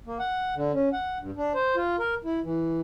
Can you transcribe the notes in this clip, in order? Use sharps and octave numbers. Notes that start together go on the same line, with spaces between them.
A#3
F#5
D3
C#4
F#5
G2
D4
C5
F4
A#4
E4
E3